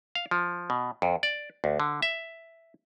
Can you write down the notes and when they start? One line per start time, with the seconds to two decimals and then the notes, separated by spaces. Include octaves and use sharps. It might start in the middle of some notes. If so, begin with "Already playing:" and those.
0.15 F5
0.31 F3
0.70 B2
1.02 F2
1.23 D5
1.64 D2
1.80 D3
2.02 E5